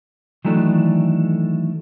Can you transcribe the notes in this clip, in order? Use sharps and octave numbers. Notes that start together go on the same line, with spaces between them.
D#3 E3 F#3 A3 D4